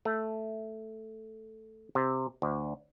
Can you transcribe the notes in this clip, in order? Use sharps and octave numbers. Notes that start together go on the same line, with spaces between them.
A3
C3
D2